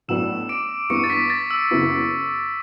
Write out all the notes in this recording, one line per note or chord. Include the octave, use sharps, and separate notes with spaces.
A1 A2 F#3 B3 D4 E6 E7
D6 D7
G2 E3 B3 C#6 C#7
A6
B6
A6
E6
F#2 C#3 E3 B3 E4